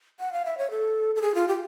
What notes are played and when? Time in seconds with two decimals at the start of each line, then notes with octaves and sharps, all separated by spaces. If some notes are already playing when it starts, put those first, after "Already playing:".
0.20 F#5
0.33 F5
0.45 E5
0.58 C#5
0.71 A4
1.15 A4
1.22 G#4
1.35 F4
1.48 G4